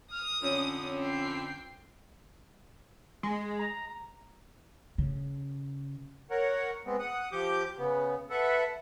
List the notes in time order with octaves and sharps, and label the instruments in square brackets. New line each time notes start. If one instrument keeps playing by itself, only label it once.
[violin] D#6 [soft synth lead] F6
[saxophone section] F2 D3 [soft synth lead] C#4
[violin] G5 C7
[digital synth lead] G#3
[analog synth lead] A#5
[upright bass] C#3
[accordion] A#4 C#5 F#5
G#3 B3 C4
F#5 D#6
F3 G4 D6 G6
C#3 B3
A4 B4 E5 F#5